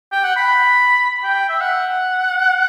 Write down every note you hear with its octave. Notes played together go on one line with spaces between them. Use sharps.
G5
F#5
B5
G5
E5
F#5